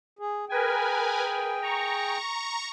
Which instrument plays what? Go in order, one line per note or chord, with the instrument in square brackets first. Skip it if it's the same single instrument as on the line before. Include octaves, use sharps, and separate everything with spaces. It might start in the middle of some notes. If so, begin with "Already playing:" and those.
[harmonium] G#4
[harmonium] G#4 G5 [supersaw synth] A#4 B4 G#5
[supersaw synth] A#5 C#6